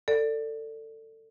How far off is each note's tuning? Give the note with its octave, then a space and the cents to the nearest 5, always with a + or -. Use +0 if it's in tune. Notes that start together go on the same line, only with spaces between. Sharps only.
A4 +25 D5 +0